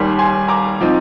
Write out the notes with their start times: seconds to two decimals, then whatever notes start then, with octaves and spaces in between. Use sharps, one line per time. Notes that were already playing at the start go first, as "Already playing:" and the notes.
Already playing: D#2 D#3 G3 G#5 C6
0.19 G#5 C6
0.48 A#5 D6
0.80 F3 C4 D#4